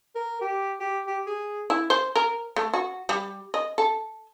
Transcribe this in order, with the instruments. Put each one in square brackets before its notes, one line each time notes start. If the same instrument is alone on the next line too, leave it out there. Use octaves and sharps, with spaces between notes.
[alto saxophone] A#4
G4
G4
G4
G#4
[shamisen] E4
C5
A#4
A3
F#4
G3
D#5
A4